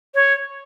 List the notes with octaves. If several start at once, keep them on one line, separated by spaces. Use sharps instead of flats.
C#5